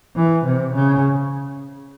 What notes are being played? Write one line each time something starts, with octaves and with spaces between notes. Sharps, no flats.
E3
C3
C#3